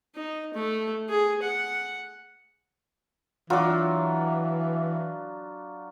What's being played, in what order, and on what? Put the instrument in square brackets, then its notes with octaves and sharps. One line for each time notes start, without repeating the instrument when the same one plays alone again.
[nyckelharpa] D#4
A3
G#4
F#5
[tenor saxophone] E3 [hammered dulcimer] F#3 [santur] D4 F4